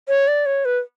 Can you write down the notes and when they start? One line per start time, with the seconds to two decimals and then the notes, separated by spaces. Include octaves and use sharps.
0.08 C#5
0.28 D5
0.46 C#5
0.65 B4